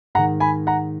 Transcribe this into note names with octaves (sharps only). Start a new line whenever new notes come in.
G#2 D#3 F#5 A#5
G#5 B5
F#5 A#5